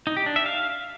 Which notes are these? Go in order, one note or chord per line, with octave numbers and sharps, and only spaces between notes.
D#4
G4
D4
E5
F5